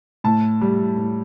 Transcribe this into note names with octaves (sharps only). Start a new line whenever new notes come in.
A2 A5
G3
A2